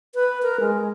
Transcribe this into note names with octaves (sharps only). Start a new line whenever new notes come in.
B4
A#4
G#3